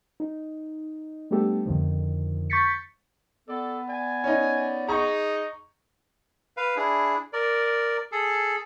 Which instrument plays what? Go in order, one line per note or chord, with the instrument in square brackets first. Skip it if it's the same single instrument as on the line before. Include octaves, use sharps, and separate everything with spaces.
[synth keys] D#4
G3 A3 B3 D4 G4 A4
F2 D3 D#3 F3
C#6 G6 A6 B6 C#7
[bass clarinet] B3 [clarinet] A4 [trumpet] D5
[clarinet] D5 [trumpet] G#5
[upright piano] C#4 D#4
[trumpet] D#4 [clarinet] G#4 [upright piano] A#5 C#6
[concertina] B4 F5
D4 E4 G#4
A#4 D5
G#4 A4